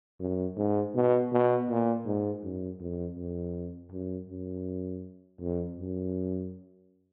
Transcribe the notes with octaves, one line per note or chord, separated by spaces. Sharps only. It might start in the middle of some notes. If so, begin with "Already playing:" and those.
F#2
G#2
B2
B2
A#2
G#2
F#2
F2
F2
F#2
F#2
F2
F#2